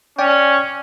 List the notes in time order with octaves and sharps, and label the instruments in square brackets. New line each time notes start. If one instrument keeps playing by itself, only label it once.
[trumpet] C#4 [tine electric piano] D5 G5